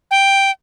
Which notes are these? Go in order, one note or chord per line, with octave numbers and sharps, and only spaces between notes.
G5